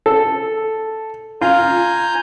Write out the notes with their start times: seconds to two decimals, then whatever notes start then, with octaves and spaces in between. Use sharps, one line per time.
0.06 A4
1.41 F4 G#5 A#5 G6